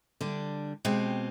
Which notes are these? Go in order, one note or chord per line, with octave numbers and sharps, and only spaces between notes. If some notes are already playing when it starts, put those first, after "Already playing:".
D3 G3 D4
B2 G#3 C4 G4